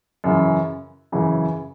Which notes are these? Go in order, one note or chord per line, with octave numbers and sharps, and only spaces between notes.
F#2 C#3 E3
F#2 C#3 E3